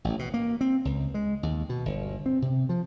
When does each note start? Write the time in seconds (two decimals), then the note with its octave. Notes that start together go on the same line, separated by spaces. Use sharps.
0.04 A1
0.19 B2
0.34 A#3
0.61 C4
0.85 C#2
1.14 G#3
1.43 D#2
1.69 B2
1.86 G1
2.26 C4
2.42 C3
2.69 F3